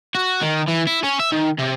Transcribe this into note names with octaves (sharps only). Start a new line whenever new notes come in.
F#4
D#3
E3
E4
C#4
E5
D#3
C3